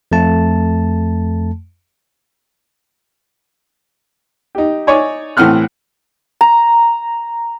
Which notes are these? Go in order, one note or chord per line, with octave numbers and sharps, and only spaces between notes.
F2 A3 A5
D#4 G4
D#4 C#5 D5 G#5
A2 E3 C4 F#5 F6 F#6
A#5